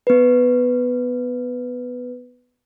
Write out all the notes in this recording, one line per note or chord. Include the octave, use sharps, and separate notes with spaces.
B3 B4